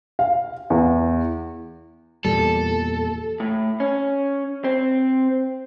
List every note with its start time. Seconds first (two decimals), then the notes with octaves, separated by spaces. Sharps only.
0.19 F5
0.70 E2
2.25 E2 A#2 G3 A4
3.40 A2
3.80 C#4
4.64 C4